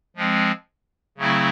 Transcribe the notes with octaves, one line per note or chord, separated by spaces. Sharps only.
F3 G#3 C4
C#3 F#3 A3 C4 E4